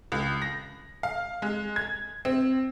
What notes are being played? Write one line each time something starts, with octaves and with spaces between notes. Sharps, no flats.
C#2
A#6
F5
G#3
G#6
C4